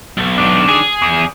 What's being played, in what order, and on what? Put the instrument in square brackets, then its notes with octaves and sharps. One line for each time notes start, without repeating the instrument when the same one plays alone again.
[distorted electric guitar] B1
[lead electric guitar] D#3 D4
[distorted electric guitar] G#4
[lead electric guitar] E2